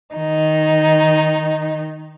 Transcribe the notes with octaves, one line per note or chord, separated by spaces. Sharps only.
D#3 D#4